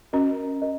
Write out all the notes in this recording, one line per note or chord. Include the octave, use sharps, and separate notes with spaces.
C#4 F#4 A#4 D#5
A#4 D#5